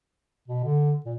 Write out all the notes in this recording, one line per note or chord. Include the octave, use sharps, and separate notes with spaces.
B2
D3
A#2